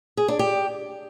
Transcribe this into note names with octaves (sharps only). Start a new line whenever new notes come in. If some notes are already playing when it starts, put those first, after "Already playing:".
G#4
D4
G4